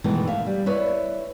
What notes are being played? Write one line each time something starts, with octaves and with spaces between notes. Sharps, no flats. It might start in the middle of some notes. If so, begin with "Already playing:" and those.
B2 D#3 E3 G#3 A3
E5 F5
G3
E4 B4 C#5 D5